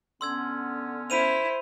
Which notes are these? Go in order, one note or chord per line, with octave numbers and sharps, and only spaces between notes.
D3 B3 C#4 C6 E6 G#6
E4 C5 B5 D#7 F7